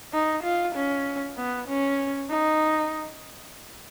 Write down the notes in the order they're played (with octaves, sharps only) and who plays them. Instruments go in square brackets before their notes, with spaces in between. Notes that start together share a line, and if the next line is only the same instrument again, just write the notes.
[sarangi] D#4
F4
C#4
B3
C#4
D#4